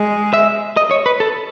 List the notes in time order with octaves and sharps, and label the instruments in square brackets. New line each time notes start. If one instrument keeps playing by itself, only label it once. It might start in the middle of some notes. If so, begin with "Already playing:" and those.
Already playing: [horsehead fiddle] G#3
[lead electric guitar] E5
D#5
C#5
B4
A4